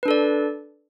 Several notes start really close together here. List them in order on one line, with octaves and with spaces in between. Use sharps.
B4 D4 A4 D5